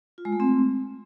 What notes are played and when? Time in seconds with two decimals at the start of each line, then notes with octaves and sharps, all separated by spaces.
0.18 F4
0.25 G#3
0.32 A3
0.40 C4